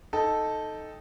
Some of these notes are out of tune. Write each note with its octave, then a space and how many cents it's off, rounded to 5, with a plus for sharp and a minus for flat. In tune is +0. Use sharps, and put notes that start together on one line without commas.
D#4 +0 A4 -5 G5 +20